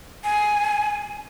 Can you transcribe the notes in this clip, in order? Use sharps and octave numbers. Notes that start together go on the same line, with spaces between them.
G#5